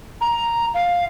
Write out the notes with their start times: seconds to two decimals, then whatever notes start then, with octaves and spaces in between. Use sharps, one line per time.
0.21 A#5
0.74 F5